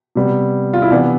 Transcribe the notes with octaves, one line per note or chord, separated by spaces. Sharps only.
C3 G3 B3
F4
E4
C3 E3 B3 D4